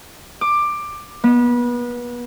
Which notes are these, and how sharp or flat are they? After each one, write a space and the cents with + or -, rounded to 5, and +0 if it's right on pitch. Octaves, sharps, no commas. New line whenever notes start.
D6 +15
B3 -30